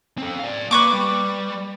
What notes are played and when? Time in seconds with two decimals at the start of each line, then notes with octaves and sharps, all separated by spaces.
0.18 C4 A4
0.39 D5 F5
0.71 A#3 B4 C#6 D6
0.93 G3